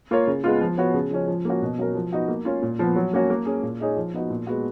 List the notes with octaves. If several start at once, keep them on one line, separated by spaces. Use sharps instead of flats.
A#3 F4 A#4 C#5
C#3
G#3 B3 F4
F3
B3 F#4 C#5
C#3
F3 G#3 C#4
F3
A#3 C#4 F#4
B2
F#3 C#4 F#4 A#4
F3
B3 D#4 F#4
A#3
C#4 F4 A#4
A#2
F3 B3
F#3
A#3 C#4 F#4
A#3
C#4 G#4
A#2
G#3 D#4 G#4 C#5
F3
B3 D#4 F#4
A#2
G#3 B3 F#4